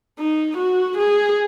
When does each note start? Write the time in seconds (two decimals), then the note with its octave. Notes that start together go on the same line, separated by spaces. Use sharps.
0.19 D#4
0.58 F#4
0.98 G#4